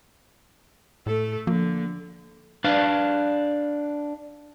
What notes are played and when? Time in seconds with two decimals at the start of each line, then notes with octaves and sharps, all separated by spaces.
1.06 A2 A3 A4
1.47 D3 F3 A#3
2.64 D4 B4 D5 F5